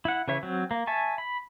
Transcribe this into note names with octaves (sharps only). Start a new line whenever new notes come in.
E4 F#5
C#3 E3 C#5 E5
F#3 C4
A#3
E5 G#5 A5 C#6
B5